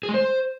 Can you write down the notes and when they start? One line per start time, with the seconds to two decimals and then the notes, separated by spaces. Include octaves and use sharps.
0.03 G#4
0.09 G#3
0.14 C5